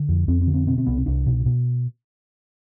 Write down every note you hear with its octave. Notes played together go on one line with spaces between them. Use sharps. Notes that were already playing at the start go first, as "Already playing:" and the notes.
Already playing: D3
F2
F2 C4
C4
D3
C4
B2 C4
C4
C2 B3
C4
C2 D4
B2
B2